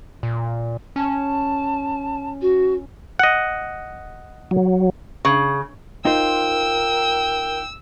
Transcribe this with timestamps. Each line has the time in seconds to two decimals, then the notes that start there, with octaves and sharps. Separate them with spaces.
0.23 A#2
0.96 C#4 A5
2.41 F#4
3.19 D#5 F#5
4.51 F#3
5.25 C#3
6.05 D#4 F4 A#4 C5 G5 E6